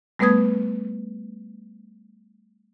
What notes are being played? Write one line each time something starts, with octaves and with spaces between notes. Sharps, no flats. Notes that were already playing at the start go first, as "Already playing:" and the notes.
G3 A3 B3 B4 D#6 G#6